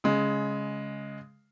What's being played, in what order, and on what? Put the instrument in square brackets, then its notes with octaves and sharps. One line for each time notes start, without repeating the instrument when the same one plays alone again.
[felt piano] C#3 G#3